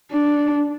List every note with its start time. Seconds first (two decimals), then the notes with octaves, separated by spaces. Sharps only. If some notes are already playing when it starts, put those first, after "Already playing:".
0.11 D4